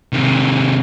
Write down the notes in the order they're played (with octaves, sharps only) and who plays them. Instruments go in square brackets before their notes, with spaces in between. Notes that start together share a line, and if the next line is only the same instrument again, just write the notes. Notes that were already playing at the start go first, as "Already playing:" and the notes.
[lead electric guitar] C3 D#3